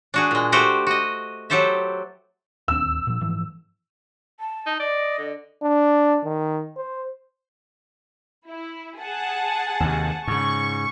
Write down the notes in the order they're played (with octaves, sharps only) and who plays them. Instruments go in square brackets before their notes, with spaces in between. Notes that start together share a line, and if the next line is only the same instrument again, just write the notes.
[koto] D4 F#4 G#4
A#2 G#3
A3 F#4 G4 C5
F#4 D#5
F#3 G4 A4 C5 E5
[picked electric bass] D1 D#2 C4 [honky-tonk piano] E6
[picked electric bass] A#2 F3
G#2 E3 F3
[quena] A5
[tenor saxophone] D#4
[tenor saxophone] D5 [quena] D#5
[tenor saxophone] D3
[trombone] D4
D#3
C5
[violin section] E4
G#4 F#5 A5
[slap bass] D#2 C3
[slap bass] G#2 C#3 [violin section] C#6